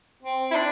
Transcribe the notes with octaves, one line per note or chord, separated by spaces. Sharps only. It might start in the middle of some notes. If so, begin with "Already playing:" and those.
C4
E4
D4